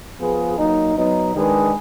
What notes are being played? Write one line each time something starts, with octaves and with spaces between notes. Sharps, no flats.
F3 B3 F4 G#4 B4
F#3 A#3 D#4
F#3 B3 D#4
D#3 G#3 D4 G#4 B4